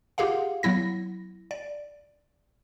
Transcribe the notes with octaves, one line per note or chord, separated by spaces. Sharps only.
F4 G4 G#4 F5 F#5
F#3 B3 E4 A#6
D5